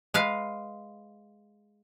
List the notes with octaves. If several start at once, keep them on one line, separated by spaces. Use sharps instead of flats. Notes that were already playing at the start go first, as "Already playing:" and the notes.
G#3 B4 F5